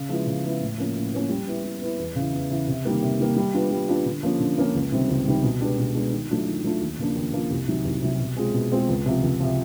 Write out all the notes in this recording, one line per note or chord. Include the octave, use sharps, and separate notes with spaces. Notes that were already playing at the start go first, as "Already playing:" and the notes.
Already playing: C#3
F3 G#3 B3 E4
C#3
F3 G#3 B3 E4
A2
F3 A#3 C#4
A2
F3 A#3 C#4
G3
B3 E4
G3
B3 E4
E2
C#3 E3
E2
C#3 E3
C3
D#3 G3 A#3
C3
D#3 G3 A#3
G3
B3 D4 F4
G3
B3 D4 F4
D3
F3 A#3 C#4
D3
F3 A#3 C#4
C#2
C3 D#3 G3 C4
C#2
C3 D#3 G3 C4
B2
G#3 B3 D4 G4
B2
G#3 B3 D4 G4
D#3
F#3 A3 D4 F4
D#3
F#3 A3 D4 F4
D#2
C#3 F3 A#3 D4
D#2
C#3 F3 A#3 D4
C2
C3 D#3 F#3
C2
C3 D#3 F#3
B2
G#3 C4 F4 G#4
B2
G#3 C4 F4 G#4
C#2
C3 F3
C#2
C3 F3